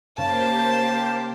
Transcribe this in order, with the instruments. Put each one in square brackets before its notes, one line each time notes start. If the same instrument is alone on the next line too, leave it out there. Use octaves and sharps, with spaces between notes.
[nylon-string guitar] C#3 [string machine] A#3 G4 C5 [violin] A5